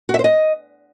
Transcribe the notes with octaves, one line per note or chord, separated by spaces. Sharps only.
F#4
E5
C5
D#5